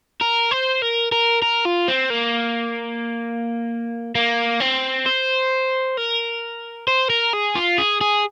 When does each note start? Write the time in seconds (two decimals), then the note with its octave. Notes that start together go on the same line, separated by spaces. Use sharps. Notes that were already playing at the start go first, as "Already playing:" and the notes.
0.21 A#4
0.51 C5
0.82 A#4
1.12 A#4
1.42 A#4
1.65 F4
1.88 C4
2.10 A#3
4.15 A#3
4.60 C4
5.06 C5
5.97 A#4
6.88 C5
7.10 A#4
7.33 G#4
7.55 F4
7.78 G#4
8.01 G#4